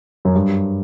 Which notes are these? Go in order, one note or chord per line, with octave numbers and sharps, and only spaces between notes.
F#2
G2